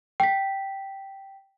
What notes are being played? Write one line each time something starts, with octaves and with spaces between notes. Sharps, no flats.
G5 B6